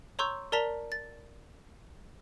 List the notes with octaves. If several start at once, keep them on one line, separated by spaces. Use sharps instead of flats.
C#5 A#5 C6 C#6 E6 G6
A#4 D5 A5 A#5 B6 G7
A6